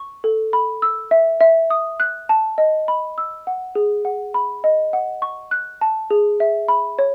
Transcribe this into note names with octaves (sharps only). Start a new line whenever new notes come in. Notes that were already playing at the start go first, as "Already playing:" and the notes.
Already playing: C#6
A4
B5
E6
E5
E5
D#6
F#6
A5
D#5
B5
E6
F#5
G#4
F#5
B5
D#5
F#5
C#6
F#6
A5
G#4
E5
B5
C#5